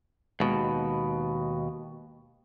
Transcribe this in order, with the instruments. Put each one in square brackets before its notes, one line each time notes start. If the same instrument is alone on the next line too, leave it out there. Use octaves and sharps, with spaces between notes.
[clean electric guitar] D#2 B2 [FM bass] G#3